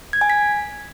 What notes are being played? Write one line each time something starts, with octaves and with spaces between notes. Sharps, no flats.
G#6
G#5
B6